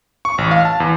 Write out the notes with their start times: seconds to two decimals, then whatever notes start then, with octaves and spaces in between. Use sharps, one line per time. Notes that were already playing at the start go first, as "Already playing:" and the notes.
0.25 C#6
0.38 A1
0.51 F5
0.65 A5
0.80 E2